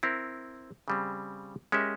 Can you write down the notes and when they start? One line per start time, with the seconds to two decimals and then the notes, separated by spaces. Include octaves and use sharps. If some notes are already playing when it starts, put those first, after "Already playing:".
0.03 C4 E4 A#4
0.88 C#3 G3 C4
1.72 G#3 C#4 G4 A#4 E5